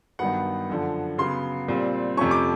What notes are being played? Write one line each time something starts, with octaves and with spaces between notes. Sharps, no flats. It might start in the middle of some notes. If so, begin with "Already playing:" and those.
G2 D#3 F#3 B3 F#5
F#2 D3 F3
C#3 F#3 B3 C6
A#2 G3 C4
F2 C3 F3 A3 C#4 C#6
D6